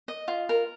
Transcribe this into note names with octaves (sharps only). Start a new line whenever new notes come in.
D#5
F4
A#4